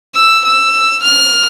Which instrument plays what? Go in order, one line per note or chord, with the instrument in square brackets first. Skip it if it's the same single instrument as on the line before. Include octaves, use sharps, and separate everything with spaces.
[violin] E6
E6
F6